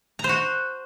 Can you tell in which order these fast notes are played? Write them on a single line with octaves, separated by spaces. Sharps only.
A#5 C5 F#4